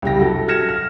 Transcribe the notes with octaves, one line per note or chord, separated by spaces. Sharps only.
C2 C#3 G4 A#6
F#2 F#4 A4
F6 G#6 A#6 C#7 E7
F6